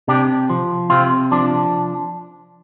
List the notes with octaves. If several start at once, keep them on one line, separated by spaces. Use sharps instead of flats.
C3 D4 G4
F3
C3 C4 F4
F3 D4